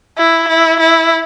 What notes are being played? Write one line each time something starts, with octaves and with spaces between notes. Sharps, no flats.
E4
E4
E4